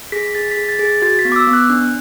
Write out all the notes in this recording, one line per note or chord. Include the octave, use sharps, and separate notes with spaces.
G#4 B6
G#4 A6
B6
G#4
A6
G#4
A6
F#4 A6
B6
B3
D6
E6
B3
F#6
D4